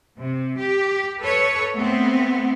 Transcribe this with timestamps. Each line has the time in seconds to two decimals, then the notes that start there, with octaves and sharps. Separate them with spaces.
0.19 C3
0.58 G4
1.20 A4 B4 C#5
1.74 A3 B3 C4